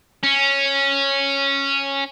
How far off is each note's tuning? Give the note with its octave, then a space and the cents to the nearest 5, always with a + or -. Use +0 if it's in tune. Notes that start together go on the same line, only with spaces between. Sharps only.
C#4 -5